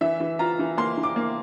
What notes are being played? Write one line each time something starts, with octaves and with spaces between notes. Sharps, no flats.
E3 E5
E3
F4 A#5
E3
A#3 C6
E3
D6
A#3